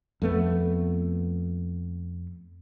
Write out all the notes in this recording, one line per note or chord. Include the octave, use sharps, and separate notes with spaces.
F2 A3 B3